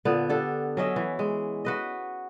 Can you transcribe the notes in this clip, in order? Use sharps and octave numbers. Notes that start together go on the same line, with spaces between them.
A#2 D3 B3
D4 G4 A4
F#3 C#4 D#5 E5
E3
G#3
F#4 B4 D#5